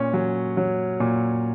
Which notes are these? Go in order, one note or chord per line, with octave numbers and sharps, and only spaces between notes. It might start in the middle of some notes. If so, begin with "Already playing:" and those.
Already playing: A#2 C#4
F#3
F#3
A#2